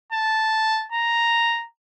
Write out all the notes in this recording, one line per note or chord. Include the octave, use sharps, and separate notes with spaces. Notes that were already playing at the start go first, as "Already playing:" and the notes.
A5
A#5